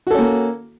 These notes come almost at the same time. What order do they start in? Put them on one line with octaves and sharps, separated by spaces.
F#4 A4 C#4 A#3